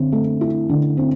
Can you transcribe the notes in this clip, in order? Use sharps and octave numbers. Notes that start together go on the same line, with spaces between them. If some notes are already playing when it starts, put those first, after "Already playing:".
Already playing: D3 C4
A3
E4
D3
C4